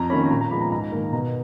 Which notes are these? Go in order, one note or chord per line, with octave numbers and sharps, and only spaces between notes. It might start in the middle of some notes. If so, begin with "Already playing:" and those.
Already playing: F2 A#5
D#3 A#3 C#4 B5
A#2 A#5
A#5
F3 G#3 B3 B5
A#5
G#2 A#5
D#3 A#3
B2 A#5